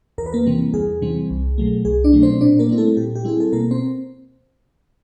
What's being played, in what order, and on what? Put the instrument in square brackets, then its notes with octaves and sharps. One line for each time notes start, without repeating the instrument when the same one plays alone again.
[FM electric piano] E2 A#4
B4
A#3 A#4
C3 E3 G3 C4
E2 G#4
C3 E3 G3 C4
C2
B2 F#3 A3
C2 G#4
D4 D5
B2 F#3 A3
C4 C5
A#2 D4 D5
A#3 A#4
G3 C4 E4
A3 A4
A#2 G4
G4
G3 C4 E4 G#4
A4
B2 A#3 A#4
C4 C5